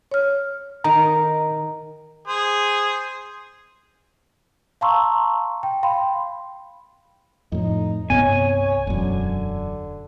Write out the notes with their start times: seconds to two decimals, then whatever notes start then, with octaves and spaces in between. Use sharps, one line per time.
0.11 C#5 F6
0.84 D#3 A#5
2.28 G#4 C5
4.81 F5 A5 A#5 C6 C#6 E6
5.63 G5
5.83 F5 G5 B5 C6
7.52 F2 A2 D#4
8.10 C2 G2 B3 C#5 G#5
8.87 E1 F#2 D3